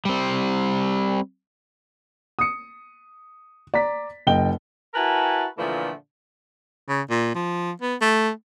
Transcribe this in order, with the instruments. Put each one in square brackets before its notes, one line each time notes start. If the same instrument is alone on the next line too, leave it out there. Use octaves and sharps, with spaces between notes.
[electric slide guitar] G3 C4
[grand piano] D#6 C#7
D5 A#5 B6
F#1 D#5 G5 G7
[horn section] E4 F#4 A#4 B4 G#5 A5
A#2 D3 E3 F3 A3
[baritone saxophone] C#3
A#2
F3
B3
A3